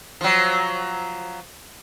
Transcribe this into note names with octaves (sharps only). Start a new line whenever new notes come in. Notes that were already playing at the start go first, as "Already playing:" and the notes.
F3 F#3